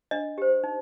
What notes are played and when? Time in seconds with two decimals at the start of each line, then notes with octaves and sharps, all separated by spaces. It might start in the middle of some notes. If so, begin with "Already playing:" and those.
0.11 D4 D#5
0.38 G4 C5
0.64 D#4